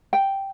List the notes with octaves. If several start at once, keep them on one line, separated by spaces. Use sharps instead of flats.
G5